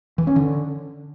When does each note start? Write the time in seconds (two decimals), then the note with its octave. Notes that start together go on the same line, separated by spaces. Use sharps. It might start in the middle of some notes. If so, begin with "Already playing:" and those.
0.18 E3
0.27 C#4
0.36 D3